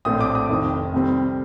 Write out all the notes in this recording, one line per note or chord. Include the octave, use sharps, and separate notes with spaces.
A#1 A2 A3 C4 D#6
D6
D#6
F1 F2 D#3
C2 C3 D#3 G3 C4